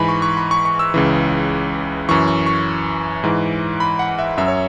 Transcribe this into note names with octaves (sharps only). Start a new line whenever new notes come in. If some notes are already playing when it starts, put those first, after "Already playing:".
Already playing: G#2 E3 G#5 B5
C#6
C#6
B5
C#6
C#6
E6
C#2 C#3 E3
F#2 E3 C#6
C#6
C#6
G#2 E3
B5
F#5
E5
F#2 F#3 E5
C#5